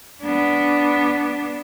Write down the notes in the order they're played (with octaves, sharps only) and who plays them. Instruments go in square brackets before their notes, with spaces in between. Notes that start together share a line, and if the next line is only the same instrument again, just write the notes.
[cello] B3 D4